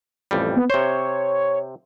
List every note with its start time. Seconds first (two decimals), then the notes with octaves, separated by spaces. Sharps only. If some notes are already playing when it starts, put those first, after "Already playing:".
0.31 A1 F2 G3
0.57 B3
0.70 C3 C5 C#5